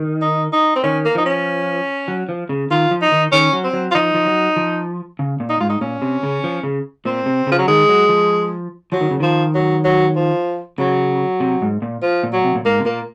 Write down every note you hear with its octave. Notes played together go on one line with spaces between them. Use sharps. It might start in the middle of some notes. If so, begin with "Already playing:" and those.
Already playing: D#3
D#4
D#4
C4
D#3 C#4
A#3
F3 D#4
C#4
F#3
F3
C#3
D#3 F4
F3
D#4
D#3
D#3 C#4
F#3
C4
F#3
F4
F3 D#4
F3
F#3
F3
C#3
A#2
D#4
G#2 F4
D#4
A#2 C#4
C3
C#3
F3
C#3
A#2 C4
C3
C#3 F3
F#3
D#3 G#3
F#3
F3
F3 F#3
D#3
C#3
D#3 F3
F#3
F#3
F3
C#3 F#3
C3
G#2
A#2
F3
A#2
F#3
C3
A#2
G#2 A#3
C3
A#2 A#3